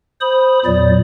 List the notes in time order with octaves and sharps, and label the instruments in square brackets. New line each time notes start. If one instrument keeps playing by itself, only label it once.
[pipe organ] C5 B5 D#6
E2 A#2 F#3 D5